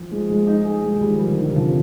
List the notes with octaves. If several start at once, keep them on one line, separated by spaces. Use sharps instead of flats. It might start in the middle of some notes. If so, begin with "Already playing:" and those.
Already playing: F3
G#3
G#3
D#4
G#4
G#3
F3
D#3 G3
G3
D3
D#3
D3
C3 F3